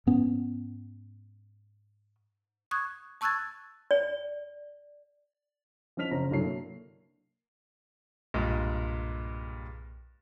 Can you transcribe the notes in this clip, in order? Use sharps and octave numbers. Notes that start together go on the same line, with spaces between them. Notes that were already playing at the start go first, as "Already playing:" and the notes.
G#2 B3 C#4
C#6 D#6 F#6 G#6
A5 C#6 E6 F#6 G#6 A6
D5
F3 C#4 D#5 F6 B6 F7
F#1 C#4 C5 A#5
C2 G2 D3 F#3 C#5 C7
A#3
B1 G2 A#2 G#3